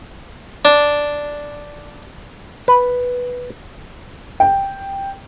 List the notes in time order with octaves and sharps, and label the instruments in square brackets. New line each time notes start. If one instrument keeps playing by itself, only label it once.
[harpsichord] D4
[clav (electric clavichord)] B4
[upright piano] G5